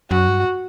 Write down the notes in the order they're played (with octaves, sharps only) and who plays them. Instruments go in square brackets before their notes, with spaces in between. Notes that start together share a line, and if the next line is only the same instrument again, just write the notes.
[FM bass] F#2 [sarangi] F#4
[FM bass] G2